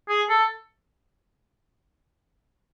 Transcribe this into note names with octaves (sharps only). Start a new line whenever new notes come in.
G#4
A4